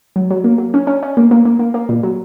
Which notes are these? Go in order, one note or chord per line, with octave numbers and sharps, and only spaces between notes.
F#3
F#3
A#3
F#3
C#4
C#4
C#4
A#3
A#3
A#3
A#3
A#3
A#2
F#3